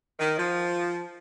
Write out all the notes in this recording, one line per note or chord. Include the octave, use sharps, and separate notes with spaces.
D#3
F3